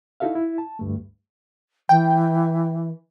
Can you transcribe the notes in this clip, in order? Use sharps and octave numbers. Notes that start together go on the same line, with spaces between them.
D#4 E4 F#4 A4 E5 F5
E4
A5
D2 G2 A3
E3 G5